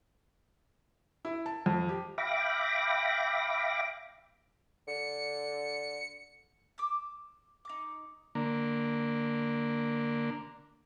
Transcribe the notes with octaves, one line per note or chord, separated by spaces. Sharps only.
E4
A5
F2
G4
E5 F5 G5 B5 D6 A#6
D3 C#7
D6 E6
D#4 D6
D3 A#3